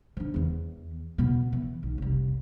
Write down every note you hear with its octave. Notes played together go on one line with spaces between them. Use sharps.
F3 D4
E2 E3
B2 B3
E3
B1
F1 C2